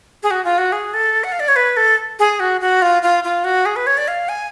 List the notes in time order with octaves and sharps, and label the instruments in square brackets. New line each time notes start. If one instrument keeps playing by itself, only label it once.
[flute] G#4
F#4
F4
F#4
G#4
A4
F#5
F5
D5
C#5
B4
A4
G#4
F#4
F#4
F4
F4
F4
F#4
G#4
B4
C#5
D5
F5
G#5